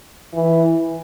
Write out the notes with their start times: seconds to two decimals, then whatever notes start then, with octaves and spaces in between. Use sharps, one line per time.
0.34 E3